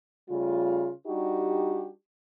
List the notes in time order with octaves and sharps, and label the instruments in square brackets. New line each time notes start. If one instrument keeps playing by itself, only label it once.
[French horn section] C#3 G3 A3 F4
G3 D4 D#4 F#4 G4